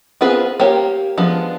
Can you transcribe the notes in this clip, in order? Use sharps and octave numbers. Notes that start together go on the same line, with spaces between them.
B3 C4 F4 G#4 B4
A#3 G4 C#5
F3 G#3 B3 D4